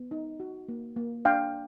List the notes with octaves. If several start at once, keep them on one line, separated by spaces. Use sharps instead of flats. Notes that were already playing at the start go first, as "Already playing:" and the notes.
Already playing: B3
D#4
F#4
A#3
A#3
D4 F5 G5